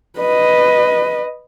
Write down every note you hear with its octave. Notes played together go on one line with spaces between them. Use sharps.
B4 D#5